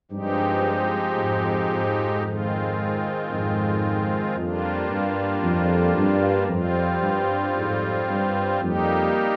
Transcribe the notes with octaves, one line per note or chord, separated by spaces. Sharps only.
G2 F3 G#3 C4 D#4 G4
F2 G#2
F2 G#2
D#3 G#3 C4 F4
F2 G#2
F2 G3 A#3 D4 F4
G2
F2
G2
F2 G3 C4 F4
G2
F2 G#2
G2
F2 G3 A#3 D#4 G4